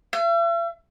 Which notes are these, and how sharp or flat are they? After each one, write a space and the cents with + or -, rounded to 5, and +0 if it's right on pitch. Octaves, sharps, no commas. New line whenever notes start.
E5 +45